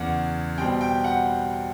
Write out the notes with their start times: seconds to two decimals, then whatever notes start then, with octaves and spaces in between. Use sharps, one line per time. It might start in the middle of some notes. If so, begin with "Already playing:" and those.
Already playing: E2 C#3 E3 D5 F#5
0.58 B2 G3 C4 G5
0.81 G5
1.04 F#5